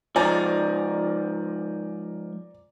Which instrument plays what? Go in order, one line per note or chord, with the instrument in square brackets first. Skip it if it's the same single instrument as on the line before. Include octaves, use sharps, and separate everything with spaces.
[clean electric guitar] G#2 F3 [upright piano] D5 G#5 A#5